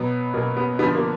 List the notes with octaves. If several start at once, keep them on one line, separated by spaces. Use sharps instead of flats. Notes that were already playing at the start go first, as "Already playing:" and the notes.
Already playing: B2 F#3 B3
B2 F#3 A#3
B3
D3 F3 B3
A#3